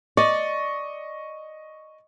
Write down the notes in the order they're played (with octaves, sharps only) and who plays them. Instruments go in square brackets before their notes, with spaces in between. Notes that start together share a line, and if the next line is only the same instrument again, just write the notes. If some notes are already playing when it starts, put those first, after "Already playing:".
[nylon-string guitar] D5 [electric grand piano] D#5 C#6